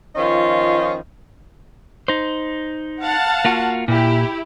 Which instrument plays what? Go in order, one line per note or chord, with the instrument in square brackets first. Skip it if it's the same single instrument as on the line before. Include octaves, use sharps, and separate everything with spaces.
[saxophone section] D#3 F3 C#4 F4 D#5
[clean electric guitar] D#4 C5
[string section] F5 F#5 A5
[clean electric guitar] A#3 F4 F#4
[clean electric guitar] A#2 [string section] E4 G4